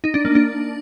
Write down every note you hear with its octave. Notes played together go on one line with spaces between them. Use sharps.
D#4
D4
A#3
D4